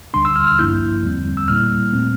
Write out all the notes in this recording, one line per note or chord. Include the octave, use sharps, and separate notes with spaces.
D2 D3 G3 D4 C6
E6
F6
F6
A1 G2 F3 A#3 E4 G6
E2 D3 G3 C4
E6
A#2 G3 A#3 E4 F6
A#2 A3 C4